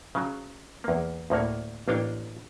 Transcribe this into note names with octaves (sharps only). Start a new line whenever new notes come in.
C#3 F#3
E2 A#3
D2 A2 A#3 C#5
A1 A#3 D4 C#5 F5 G5